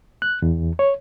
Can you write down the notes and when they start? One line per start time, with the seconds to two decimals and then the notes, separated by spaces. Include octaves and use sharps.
0.22 F#6
0.42 E2
0.79 C#5